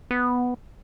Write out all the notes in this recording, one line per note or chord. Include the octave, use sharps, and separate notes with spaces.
B3